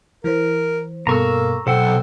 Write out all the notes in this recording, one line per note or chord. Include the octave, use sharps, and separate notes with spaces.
E3 A#4 C5
G2 B2 A#3 A4 A#5 C#6 E6
B1 C4 A4 C5 F#5